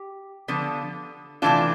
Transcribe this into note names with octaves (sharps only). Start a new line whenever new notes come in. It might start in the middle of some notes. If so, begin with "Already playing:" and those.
Already playing: G4
D3 F3 B3
C3 E3 A3 D4 F4